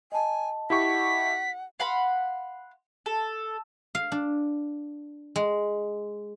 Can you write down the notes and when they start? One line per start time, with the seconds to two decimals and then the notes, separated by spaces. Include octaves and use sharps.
0.12 D#5 G#5 A5
0.70 E4 G4 F#5 C#6 B6
1.80 F5 F#5 B5 C6
3.06 A4
3.95 F5
4.12 D4
5.36 G#3